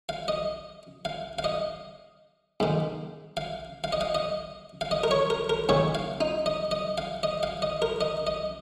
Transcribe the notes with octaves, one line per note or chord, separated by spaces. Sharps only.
F5
D#5
F5
F5
D#5
G#2 D#3
F5
F5
D#5
F5
D#5
F5
D#5
A#4
C#5
A#4
A#4
G#2 D#3 C#5
F5
D#4
D#5
D#5
F5
D#5
F5
D#5
A#4
D#5
D#5